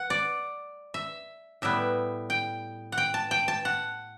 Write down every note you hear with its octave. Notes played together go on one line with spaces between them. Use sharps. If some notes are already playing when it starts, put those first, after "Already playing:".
Already playing: F#5
D5
E5
A2 G3 B3 E5
G5
F#5
G5
A5
G5
A5
F#5